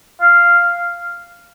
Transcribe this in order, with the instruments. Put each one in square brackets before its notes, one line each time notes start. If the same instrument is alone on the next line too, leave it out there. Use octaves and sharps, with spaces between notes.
[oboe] F5